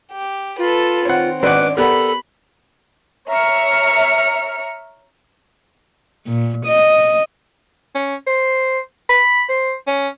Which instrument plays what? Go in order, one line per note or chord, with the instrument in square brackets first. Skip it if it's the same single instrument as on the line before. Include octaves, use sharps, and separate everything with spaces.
[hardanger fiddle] G4
[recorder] F4 [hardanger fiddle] A4 B4
[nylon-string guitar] D#3 D#4 [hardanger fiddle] C4 [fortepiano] C#5 F#5
[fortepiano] G#1 F#5 [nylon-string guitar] C#4 D4 D5 [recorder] B4 [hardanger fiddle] D6
[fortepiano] B3 G4 A#4 [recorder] A4 [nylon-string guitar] D5 F#5 [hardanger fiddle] B5
[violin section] C#5 E5 A#5 F6 C#7
[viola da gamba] A#2
D#5
[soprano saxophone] C#4
C5
B5
C5
C#4